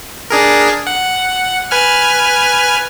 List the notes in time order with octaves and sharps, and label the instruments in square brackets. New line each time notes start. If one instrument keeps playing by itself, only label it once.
[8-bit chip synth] D4 G#4 A#4
F#5
B4 G#5 F6